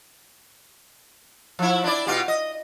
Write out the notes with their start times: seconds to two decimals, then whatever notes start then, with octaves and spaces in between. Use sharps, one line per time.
1.59 F3 E4
1.84 D4 E4 D5
2.07 B2 F4 G4
2.28 D#5